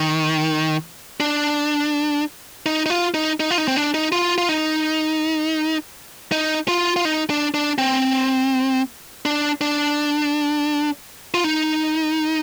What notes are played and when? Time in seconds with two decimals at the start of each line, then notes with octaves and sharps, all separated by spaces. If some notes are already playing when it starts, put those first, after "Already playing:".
Already playing: D#3
1.20 D4
2.66 D#4
2.86 D#4
2.90 F4
3.14 D#4
3.40 D#4
3.51 F4
3.58 D#4
3.68 C4
3.77 D4
3.94 D#4
4.12 F4
4.38 F4
4.49 D#4
6.32 D#4
6.68 F4
6.96 F4
7.05 D#4
7.30 D4
7.54 D4
7.78 C4
9.25 D4
9.61 D4
11.34 F4
11.44 D#4